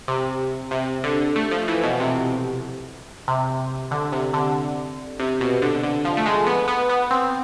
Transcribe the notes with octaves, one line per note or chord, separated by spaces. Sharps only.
C3
C3
D3
A3
F3
E3
B2
C3
C3
D3
C3
D3
C3
B2
D3
D3
F3
A3
G#3
B3
B3
B3
C4